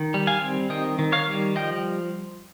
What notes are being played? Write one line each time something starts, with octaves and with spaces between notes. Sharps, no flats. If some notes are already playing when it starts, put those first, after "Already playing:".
Already playing: D#3
G3
F5 G#5
C4
D#3 D#5 G5
D#3
C#5 F5
G3
F3 D#5 G5